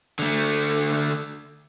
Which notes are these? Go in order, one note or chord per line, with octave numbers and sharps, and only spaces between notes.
D3 A3